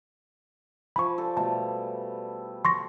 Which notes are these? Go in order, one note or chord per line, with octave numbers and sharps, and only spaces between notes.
F3 G#5 B5 C#6
A4 C5 D5
B2 G3 A3 A5
C6 C#6 A#6